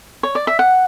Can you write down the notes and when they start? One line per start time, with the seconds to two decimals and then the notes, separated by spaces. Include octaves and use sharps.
0.23 C#5
0.35 D5
0.47 E5
0.59 F#5